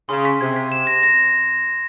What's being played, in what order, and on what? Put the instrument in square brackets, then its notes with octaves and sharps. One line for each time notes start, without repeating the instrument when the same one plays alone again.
[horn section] C#3 [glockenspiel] C6
[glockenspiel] B6
[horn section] C3 [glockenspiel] G#6
[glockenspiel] B6
E7
A#6
A#6